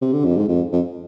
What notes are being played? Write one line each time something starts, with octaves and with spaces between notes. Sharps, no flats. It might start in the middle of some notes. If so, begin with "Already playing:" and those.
C3
D3
F2
G#2
F2
F2